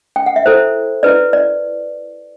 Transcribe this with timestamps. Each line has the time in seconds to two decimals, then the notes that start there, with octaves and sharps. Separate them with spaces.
0.16 G5
0.26 F#5
0.36 E5
0.46 E4 A4 C5
1.03 E4 B4 D5
1.33 D5